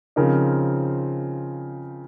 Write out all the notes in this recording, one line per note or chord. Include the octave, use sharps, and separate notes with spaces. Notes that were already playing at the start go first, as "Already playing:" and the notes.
C#3 F3 C4 D#4 A#4